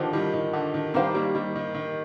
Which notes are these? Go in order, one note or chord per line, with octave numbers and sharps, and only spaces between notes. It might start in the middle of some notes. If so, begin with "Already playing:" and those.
Already playing: D3 D#3 F3 G4 C5 D#5
D#3 G3
D#3
D3
D#3
D#3 G3 D#4 G4 C5 F5
G3 A#3
D#3 G3
D#3
D#3